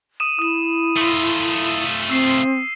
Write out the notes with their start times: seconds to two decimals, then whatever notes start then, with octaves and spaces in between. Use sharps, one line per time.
0.20 D#6 D#7 E7
0.39 E4 D#6 E7
0.97 A3 F4
2.10 C4 E6 C7